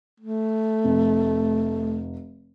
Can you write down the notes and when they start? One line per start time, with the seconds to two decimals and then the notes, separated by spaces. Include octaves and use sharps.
0.20 A3
0.84 F1